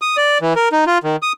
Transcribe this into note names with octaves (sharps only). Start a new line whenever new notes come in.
D#6
D5
E3
A#4
D#4
F4
D#3
D#6